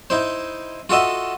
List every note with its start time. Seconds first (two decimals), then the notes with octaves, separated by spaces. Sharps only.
0.10 D#4 E4 C5
0.89 F4 F#4 A4 D#5 E5